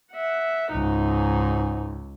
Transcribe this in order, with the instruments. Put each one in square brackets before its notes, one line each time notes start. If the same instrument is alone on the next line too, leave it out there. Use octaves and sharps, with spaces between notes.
[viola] E5 F#5
[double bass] C#2 [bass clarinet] G#2 [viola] D#4